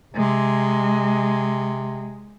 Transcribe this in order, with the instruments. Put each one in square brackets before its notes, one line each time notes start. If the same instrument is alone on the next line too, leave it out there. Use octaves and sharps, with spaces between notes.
[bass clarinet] C3 [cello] G#3